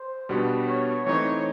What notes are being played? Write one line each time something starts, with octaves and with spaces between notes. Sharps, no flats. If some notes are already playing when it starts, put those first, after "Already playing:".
Already playing: C5
B2 G3 B3 D4 F#4
C#5
E3 A3 C4 D#4 C#5